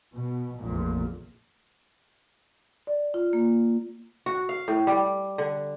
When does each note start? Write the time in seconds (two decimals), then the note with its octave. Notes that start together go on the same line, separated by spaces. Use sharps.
0.14 B2
0.60 F1 A#1 E2 A#2
2.87 D5
3.14 F4
3.33 A#3
4.26 F#4
4.49 F5
4.68 A2
4.87 G3
5.38 D3